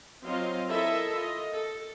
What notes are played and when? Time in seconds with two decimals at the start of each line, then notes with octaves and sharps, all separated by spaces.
0.23 F#3 C4 F4 C5 D#5 F5
0.71 E4 A4 A#4 D#5 E5
1.15 F4 D#5
1.54 A4